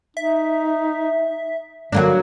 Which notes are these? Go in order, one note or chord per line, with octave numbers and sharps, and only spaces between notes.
D#4 E5
D3 F#3 A#3 D4